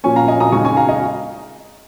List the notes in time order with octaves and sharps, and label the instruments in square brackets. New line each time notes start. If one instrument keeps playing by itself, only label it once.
[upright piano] A#2 F3 C#4 G#5 C#6
F5 A#5
D#5 G#5
A#5 D#6
C#3 G#3 D#4 G#5 C#6
G#5 C#6
F5 A#5
D#5 G#5